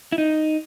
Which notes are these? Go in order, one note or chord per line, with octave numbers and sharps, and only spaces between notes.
E4
D#4